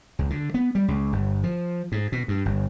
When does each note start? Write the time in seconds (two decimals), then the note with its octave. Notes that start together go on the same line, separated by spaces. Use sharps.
0.19 C#2
0.30 D3
0.54 B3
0.75 G3
0.88 C#2
1.13 G1
1.43 F3
1.92 G#2
2.12 B2
2.28 G2
2.45 G1